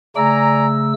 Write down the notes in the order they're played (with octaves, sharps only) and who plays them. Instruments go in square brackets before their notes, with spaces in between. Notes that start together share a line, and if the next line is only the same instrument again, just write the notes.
[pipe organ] C#3 A3 E6 [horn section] D5 G#5 A#5